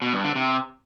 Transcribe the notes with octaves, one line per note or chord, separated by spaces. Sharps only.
B2
G2
D3
C3